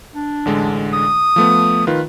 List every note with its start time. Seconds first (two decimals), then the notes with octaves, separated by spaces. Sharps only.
0.15 D4
0.45 A1 D3 G#3
0.93 D#6
1.36 F3 A3 B3
1.87 D#3 F4 B4